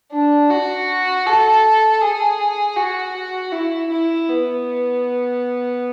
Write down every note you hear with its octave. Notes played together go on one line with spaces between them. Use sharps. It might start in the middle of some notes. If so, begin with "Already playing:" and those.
D4
F#4
A4
G#4
F#4
E4
E4
B3